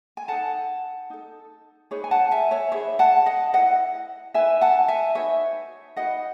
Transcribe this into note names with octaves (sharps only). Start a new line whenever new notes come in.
G#5
D#4 A4 F#5 A5
D#4 A4
D#4 G#4 B4 C#5
G#5
F#5 A5
E5 G#5
C#5 E5
D#4 G#4 B4 C#5 E5
F#5 A5
D#5 F#5
E4 B4 D#5 F#5
E4 B4 E5 G#5
F#5 A5
E5 G#5
D#4 F#4 B4 C#5 E5
D#4 F#4 B4 D#5 F#5